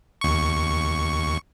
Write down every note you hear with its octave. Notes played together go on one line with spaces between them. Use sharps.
D#2 C#6